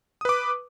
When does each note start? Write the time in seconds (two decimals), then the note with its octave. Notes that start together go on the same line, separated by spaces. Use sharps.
0.21 D#6
0.25 B4
0.29 D6